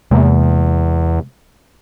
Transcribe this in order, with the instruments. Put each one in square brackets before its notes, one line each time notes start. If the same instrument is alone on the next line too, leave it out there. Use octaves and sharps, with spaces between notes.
[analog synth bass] E2 [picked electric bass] C3 G#3 A#3